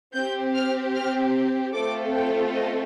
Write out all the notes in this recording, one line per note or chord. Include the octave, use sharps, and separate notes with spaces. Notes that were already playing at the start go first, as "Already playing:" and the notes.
C4 G4 G6
F6
F6
A3 C4 F4 A4 D6
G5
D#5